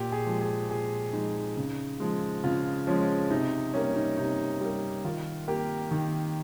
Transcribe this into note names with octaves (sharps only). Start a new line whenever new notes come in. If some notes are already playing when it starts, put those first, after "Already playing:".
Already playing: A#2 G4
G#4
F3 G#3
G#4
A#2 G#4
F3 G#3 D#4
C#3
F3 G#3
C#3 F4
F3 G#3 C#4
C3 D#4
G3 A#3 C#4
D#4
C3 D#4
G3 A#3
D#3 F4
A#3 G4
D#3